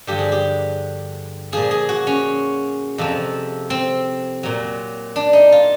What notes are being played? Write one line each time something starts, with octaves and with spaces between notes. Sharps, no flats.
G2 D3 F3 G4
G#4
G4
A#2 F3 G#4
G#4
F#4
C#4
F2 C3 F3
C4
A#2 F#3
D4
D#4
F4